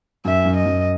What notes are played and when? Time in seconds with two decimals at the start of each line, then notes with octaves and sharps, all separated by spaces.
0.25 F#2 E5
0.45 F#2
0.56 D#5
0.66 F#2